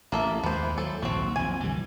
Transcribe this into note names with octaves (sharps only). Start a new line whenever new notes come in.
A1 A#3 A4 E5
D#2 G#3 B3 C5
F#3 A4
A#1 D#2 G#2 C4 F#4
B1 F2 G#5
D3 E3 G3